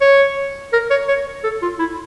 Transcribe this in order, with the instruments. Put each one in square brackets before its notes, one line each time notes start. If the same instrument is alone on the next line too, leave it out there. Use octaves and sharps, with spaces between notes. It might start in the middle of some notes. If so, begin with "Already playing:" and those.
[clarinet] C#5
A#4
C#5
C#5
A4
F4
E4